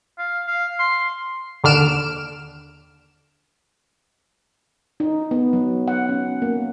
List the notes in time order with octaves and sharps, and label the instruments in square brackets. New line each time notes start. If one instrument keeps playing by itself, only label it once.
[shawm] F5
F5
C6
[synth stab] D#2 D3 D4 F6 D7 E7
[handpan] D#4
B3
F#3
F#5
C#4
A#3